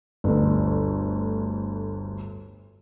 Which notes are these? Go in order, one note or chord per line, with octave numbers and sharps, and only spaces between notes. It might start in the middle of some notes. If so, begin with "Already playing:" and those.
G1 D2